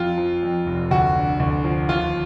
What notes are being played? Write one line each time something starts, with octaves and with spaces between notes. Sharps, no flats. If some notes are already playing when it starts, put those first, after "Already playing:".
Already playing: F2 F4
F3
F2
F1
D2 F#4
D3
D2
F3
D#2 F4